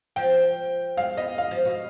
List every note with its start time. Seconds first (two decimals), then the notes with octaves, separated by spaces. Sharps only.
0.16 F3 G5
0.97 G#3 F5
1.17 B3 D#5
1.38 F5
1.51 F3
1.65 B2